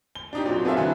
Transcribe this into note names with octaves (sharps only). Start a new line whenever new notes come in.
G7
D4 D#4 G4
A#2 F#3 C4
B3 C4 G#4 A4 E5 F5
D3 E3 F#3